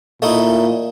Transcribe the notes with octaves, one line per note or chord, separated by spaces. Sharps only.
A#2 A3 D#4 E4